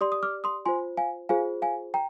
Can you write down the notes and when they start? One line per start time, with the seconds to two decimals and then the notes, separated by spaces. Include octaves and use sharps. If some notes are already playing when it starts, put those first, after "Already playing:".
0.01 G4 D5 C6 D#6
0.12 D#6
0.23 D6 F6
0.44 C6 D#6
0.65 F4 C5 G#5 C6
0.97 F5 G#5
1.29 F4 G#4 C5 F5 G#5
1.62 F5 G#5
1.94 G5 A#5